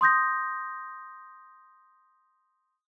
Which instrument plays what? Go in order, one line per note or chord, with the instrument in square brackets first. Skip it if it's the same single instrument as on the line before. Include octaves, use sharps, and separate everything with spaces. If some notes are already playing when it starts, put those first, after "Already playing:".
[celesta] C6 D#6 G6 A#6